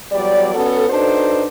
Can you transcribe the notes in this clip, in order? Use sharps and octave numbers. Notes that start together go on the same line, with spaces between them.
E2 F#3 G3 D5
B3 C#4 F#4 A4
D4 D#4 F#4 A4 B4 C5